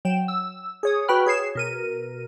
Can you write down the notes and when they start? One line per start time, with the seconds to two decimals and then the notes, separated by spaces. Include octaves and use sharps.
0.05 F#3 G5 E7
0.28 E6
0.83 G#4 C#5 D#6
1.08 F#4 B4 G5 B5 F6
1.26 G#4 C#5 G#6 C7 E7
1.55 B2 A#4 D#7